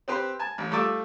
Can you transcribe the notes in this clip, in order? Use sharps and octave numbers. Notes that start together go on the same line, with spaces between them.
C4 G4 B4 C5
G#5 A5
A1
G3 A3 F4 A5 D6 E6